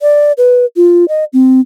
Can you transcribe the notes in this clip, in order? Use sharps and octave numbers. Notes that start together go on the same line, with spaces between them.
D5
B4
F4
D#5
C4